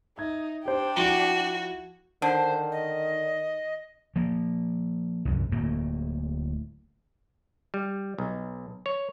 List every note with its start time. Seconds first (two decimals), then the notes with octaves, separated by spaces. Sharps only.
0.18 D#4 E5 G#6
0.66 D4 G4 C5 G5
0.97 F3 E4 F#4 E7
2.22 D3 D#3 C5
2.72 D#5
4.16 F3 A#3
5.25 C2 F#2
5.51 D1 A2 A3 A#3
7.74 G3
8.18 B1
8.86 C#5